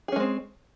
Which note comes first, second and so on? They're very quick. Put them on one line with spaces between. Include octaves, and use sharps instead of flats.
G#4 C#4 G#3 C4